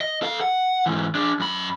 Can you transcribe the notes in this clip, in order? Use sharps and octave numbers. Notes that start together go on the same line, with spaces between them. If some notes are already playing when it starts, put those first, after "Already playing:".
D#5
A4 F5
F#5
G#2 E3
D4 G#4
F#2 B5